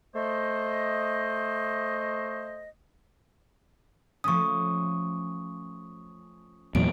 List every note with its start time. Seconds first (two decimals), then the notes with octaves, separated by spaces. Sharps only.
0.15 A3 C5 D#5
4.24 F3 A3 C#4 C#6 D#6
6.75 E2 A#2 F#3 D7